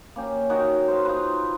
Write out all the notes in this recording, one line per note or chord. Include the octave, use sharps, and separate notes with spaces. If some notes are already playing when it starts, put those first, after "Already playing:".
A#3 C#4 G4
D#3 D#4 F#4 A#4
C5 F5
D#4 F4 B4